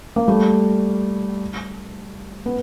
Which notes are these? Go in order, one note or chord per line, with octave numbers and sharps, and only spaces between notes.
A#3
G3 A3
B3